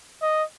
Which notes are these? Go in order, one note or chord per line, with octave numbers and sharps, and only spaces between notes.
D#5